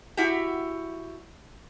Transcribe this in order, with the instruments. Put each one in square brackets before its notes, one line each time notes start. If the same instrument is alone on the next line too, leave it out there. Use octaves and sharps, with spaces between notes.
[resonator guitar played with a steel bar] E4 F#4 G4